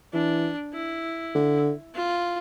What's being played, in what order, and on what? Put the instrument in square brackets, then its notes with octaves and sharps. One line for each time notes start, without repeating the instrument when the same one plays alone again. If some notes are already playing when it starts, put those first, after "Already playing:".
[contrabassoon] E3 [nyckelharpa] D4
[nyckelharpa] E4
[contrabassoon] D3
[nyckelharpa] F4